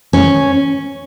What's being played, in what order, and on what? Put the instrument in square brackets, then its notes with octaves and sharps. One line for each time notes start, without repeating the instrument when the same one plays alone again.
[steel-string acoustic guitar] C#4